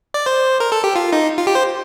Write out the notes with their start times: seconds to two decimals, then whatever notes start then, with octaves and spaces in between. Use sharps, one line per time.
0.14 D5
0.26 C5
0.60 A#4
0.72 A4
0.84 G4
0.96 F4
1.13 D#4
1.38 F4
1.47 G4
1.55 C5